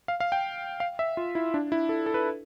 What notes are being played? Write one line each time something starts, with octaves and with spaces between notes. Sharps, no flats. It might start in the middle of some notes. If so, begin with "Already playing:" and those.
F5
F5
G5
F5
E5
F4
E4
D4
E4
A4
A4
B4